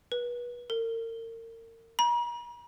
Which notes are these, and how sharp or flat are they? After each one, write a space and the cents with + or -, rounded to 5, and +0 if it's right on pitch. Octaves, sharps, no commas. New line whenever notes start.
B4 -30
A#4 -35
A#5 +45